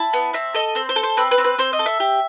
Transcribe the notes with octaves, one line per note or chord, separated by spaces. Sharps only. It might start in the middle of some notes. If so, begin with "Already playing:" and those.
Already playing: E4 A5
B3
C4 E5
A4 D#5
C4 C5
C5
A4
C5
C4 B4
B4
C4
B4
C4 C5
D#5
A4
E5
G4